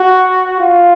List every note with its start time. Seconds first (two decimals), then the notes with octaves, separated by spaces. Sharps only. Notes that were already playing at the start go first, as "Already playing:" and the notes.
Already playing: F#4
0.60 F4